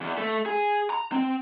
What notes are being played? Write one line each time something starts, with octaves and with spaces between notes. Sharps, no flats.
E2
A3
G#4
A#5
C4